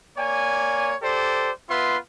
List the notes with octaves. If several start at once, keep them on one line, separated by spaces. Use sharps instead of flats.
A#3 C#5 D5 G#5
G4 A4 C5 D5
B3 F4 B4 E5 C6